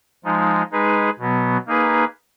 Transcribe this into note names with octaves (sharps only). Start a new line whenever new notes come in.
F3 G#3 D#4
G#3 D#4 G#4 B4
B2 F#3 B3
A#3 D#4 G#4 B4